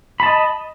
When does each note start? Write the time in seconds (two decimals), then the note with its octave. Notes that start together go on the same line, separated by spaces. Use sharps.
0.20 B5
0.23 A5
0.26 D#5